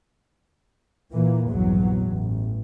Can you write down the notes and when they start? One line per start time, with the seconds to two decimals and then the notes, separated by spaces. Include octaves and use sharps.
1.13 A#2 E3 A#3
1.47 A#1 E2 G2 F#3
2.05 A1